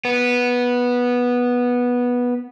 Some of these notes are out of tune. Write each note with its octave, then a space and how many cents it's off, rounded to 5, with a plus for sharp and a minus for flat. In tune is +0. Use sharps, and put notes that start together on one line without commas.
B3 -10